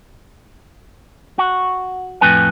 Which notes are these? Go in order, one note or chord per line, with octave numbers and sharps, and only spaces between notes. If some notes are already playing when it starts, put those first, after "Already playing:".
F#4
F2 A2 C4 B4 G#5